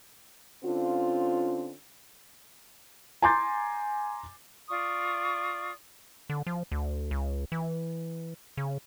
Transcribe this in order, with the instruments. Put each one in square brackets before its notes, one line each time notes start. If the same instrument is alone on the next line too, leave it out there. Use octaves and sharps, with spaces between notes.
[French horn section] D3 C4 C#4 F4
[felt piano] G#5 A#5 C6 D6 G6 A6
[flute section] F4 D5 C#6 D#6
[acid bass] D3
F3
D2
C#2
E3
C#3